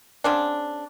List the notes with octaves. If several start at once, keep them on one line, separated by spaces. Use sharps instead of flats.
C#3 C4 D4